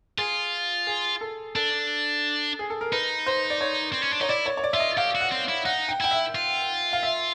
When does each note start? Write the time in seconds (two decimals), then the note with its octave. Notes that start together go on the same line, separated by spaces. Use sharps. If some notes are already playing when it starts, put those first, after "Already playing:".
0.18 F4 G#4
0.87 G#4
1.21 A4
1.55 D4 A4
2.59 G#4
2.70 A4
2.81 A#4
2.92 D#4 B4
3.26 C5
3.50 D5
3.61 C#5
3.93 C4
4.02 C#4
4.12 D4
4.20 D#4 C#5
4.29 E4 D5
4.46 C#5
4.57 C#5
4.64 D5
4.73 F4 E5
4.80 D#5
4.97 G4 F5
5.15 F#4
5.21 F#5
5.31 C4
5.49 E4
5.65 D#4 F#5
5.89 G5
6.01 E4 G5
6.11 E5
6.35 F4
6.93 F5
7.03 E5